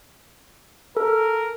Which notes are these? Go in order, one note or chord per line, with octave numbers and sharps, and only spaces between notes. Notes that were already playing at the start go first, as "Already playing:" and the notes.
A4 A#4